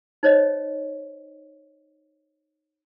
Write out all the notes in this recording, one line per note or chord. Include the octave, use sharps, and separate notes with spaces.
D#4 C5 C#5 D#5